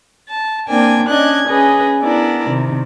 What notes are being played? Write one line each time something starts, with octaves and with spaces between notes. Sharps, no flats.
A5
A#3 C4 D4 G5 G#5
C#4 D4 D#5 F#6 G#6
C#4 G#4 B4 D#5
B3 D4 E4 A#4 D5
C3 D#3